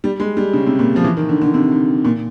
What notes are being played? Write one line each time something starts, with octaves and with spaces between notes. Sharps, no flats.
G3
G#3
G3
C#3
C3
A#2
F3
E3
D#3
D3
D3
C3
C3
A#2